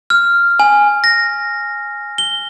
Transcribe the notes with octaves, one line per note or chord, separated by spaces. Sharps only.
F6
G#5
A#6
G7